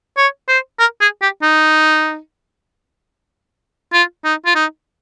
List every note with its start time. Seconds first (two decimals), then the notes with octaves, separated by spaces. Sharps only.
0.18 C#5
0.49 C5
0.80 A#4
1.01 G#4
1.22 G4
1.43 D#4
3.93 F4
4.25 D#4
4.46 F4
4.56 D#4